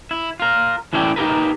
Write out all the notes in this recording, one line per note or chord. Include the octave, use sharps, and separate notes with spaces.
E4
F4 A#4
A2 E3 C#4 E4 D5 G5
D#4 G4 G#4 A#4 B4